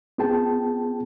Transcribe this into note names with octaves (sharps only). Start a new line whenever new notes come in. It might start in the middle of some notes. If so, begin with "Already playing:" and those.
B3 C4 F4 G#4 G5 A5